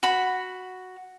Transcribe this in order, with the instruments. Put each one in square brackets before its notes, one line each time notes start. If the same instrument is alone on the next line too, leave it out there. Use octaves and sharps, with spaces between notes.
[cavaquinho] F#4 B5